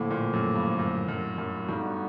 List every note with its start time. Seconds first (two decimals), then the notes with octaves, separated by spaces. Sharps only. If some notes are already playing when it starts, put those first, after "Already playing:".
Already playing: F2 A2 D3 F3 A#3
0.10 A#2
0.33 F#2
0.55 G2
0.79 F#2
1.08 F#2
1.38 F#2
1.68 G2 D3 G3 B3 D#4 F#4